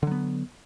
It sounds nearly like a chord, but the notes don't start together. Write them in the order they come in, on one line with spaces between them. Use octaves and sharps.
D3 F#3 B3